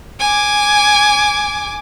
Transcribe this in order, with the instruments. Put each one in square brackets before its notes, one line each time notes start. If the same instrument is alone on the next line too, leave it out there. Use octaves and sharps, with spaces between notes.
[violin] G#5 D6